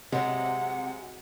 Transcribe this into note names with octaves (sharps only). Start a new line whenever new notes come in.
C3 F#3 G#3 F#5